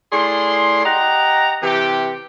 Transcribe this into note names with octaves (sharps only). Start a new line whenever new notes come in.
A2 G#4 D5 C6
G4 D#5 F#5 A#5
C3 E3 G4